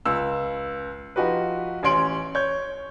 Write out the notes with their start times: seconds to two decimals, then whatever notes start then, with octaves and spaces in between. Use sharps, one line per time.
0.05 C#2 E6
1.16 F3 D#4 F#4 G4 B4
1.83 A1 C#4 C#5 C6 D7 F#7
2.35 C#5 G6